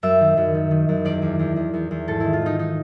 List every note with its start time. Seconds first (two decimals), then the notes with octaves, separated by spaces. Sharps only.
0.03 F#2 E5
0.20 D#3
0.37 F#2
0.54 D#3
0.71 D#3
0.89 F#2
1.05 E2 D5
1.22 E2
1.39 E2
1.56 E2
1.74 E2
1.91 E2
2.08 G#2 A4
2.20 D#3 E4
2.33 F4
2.42 G#2 D#4
2.59 D#4